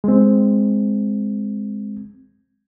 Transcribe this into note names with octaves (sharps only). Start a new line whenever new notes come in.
G#3 C4